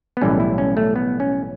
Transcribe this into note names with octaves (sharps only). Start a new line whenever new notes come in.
B3
B1 A2 E3 G3 C#4
E4
C#4
A3
B3
C#4